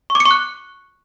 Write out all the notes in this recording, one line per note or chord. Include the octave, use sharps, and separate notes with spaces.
C#6
D6
C#7
C#6
F#6